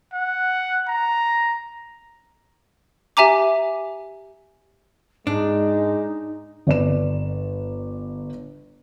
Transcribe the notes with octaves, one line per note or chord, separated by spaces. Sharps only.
F#5
A#5
G4 E5 G#5 A#5 D6
G#2 G#3 D4 D#4
G1 D5 E7